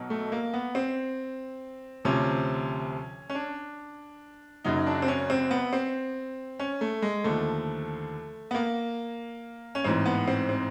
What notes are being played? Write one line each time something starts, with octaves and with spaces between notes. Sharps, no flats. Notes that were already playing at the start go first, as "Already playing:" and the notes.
Already playing: B1 B2 F#3
A3
A#3
B3
C4
D2 C3 F3 C#4
C#4
D4
F#1 F#2 C#3 F#3 D#4
D4
C4
C#4
C4
B3
C4
C#4
A3
G#3
D#2 D3 F3 A3
B3
A#3
C#4
A1 G#2 E3 C4
B3
C4
C4